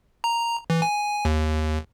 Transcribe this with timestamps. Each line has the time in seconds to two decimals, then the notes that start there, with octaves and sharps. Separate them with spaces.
0.24 A#5
0.70 E3
0.82 G#5
1.25 D#2